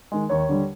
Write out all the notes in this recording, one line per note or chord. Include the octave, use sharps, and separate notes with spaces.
D#3 G#3
D#2 C#5
D3 G3